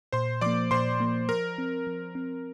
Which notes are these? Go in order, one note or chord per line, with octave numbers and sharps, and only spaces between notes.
A#2 C5 C6
F3 A#3 D5 D6
A#2 C5 C6
F3 A#3
F3 A#4
C4
F3
C4